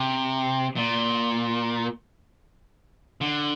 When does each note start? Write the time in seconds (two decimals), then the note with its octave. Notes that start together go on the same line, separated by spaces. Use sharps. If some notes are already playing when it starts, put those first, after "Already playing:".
Already playing: C3
0.76 A#2
3.21 D3